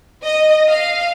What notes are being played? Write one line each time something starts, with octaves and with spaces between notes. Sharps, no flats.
D#5
F5